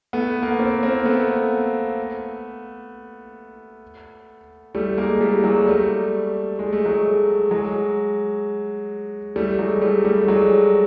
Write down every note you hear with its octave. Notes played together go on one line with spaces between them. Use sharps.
A3 B3
A#3
B3
A#3 C4
A#3 C4
A3 B3
G3 A3
G#3 A#3
G3 A3
F#3 G#3
G3 A3
G#3
A3
F#3 G#3
F#3 G#3
G3 A3
F#3 G#3
G3 A3
G3 A3
F#3 G#3